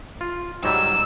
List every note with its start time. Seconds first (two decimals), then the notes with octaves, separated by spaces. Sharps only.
0.21 F4
0.64 G#2 F#3 G3 E6